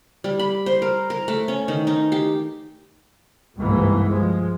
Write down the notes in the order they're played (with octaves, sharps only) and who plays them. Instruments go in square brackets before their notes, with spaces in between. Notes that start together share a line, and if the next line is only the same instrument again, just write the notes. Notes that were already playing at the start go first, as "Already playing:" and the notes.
[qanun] G3
B5
C5
A#4
A#4
A3
C#4
D#3
D#4
G4
[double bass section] G1 C2 G#2 B2 E3 A#3
F3 G#3